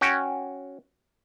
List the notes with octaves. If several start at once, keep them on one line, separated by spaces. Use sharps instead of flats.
C#4 F#4 C#5 G5